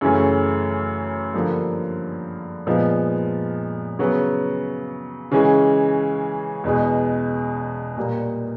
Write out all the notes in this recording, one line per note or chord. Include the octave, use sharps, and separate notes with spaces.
F#2 C#3 E3 A3 C#4
G2 D3 F3 A#3
A#2 F3 G#3 B3 D#4
C#3 F#3 B3
C#3 E3 G#3 C#4
E2 B2 G#3
A#2 G3 A#3